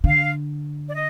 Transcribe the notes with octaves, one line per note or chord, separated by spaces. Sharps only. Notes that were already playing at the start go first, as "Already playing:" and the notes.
D3 F5
D5
D#5